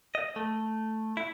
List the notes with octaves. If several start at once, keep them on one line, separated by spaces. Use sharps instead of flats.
D#5
A3
E4